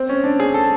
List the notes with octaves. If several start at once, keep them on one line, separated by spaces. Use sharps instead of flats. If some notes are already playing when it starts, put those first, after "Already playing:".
Already playing: C4
C#4
D4
G#4
A4